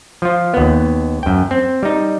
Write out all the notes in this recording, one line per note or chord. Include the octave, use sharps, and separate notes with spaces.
F3 F4
D#2 B3
F#2 G5
C4
G3 D#4